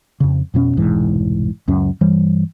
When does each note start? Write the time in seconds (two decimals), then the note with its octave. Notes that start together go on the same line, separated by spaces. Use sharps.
0.20 F2 C#3
0.54 F2 B2 A#3 C#4
0.77 F1 B1 G#2 E3
1.68 C#2 F#2 C#4
2.01 G2 E3 G3